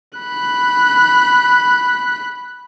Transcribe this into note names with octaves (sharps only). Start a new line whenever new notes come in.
B5 F#6